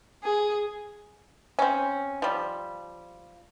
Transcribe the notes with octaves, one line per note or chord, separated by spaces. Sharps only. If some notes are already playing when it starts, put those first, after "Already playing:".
G#4
C4 C#4
F3 G3